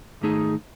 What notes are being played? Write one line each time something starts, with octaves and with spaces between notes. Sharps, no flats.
G#2 D#3 A3 D#4 G#4